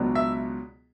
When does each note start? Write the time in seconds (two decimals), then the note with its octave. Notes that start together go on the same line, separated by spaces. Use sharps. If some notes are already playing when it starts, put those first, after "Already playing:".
Already playing: C#2 B2 F#3 B3 D4
0.15 E5